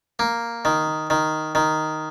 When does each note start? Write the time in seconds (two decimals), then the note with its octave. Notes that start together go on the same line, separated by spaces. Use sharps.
0.19 A#3
0.65 D#3
1.10 D#3
1.55 D#3